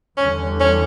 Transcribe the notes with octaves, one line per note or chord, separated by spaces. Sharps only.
E2 D3 G3 C#4
C#4